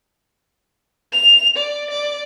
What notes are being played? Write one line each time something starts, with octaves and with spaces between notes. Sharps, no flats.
F7
D5
D5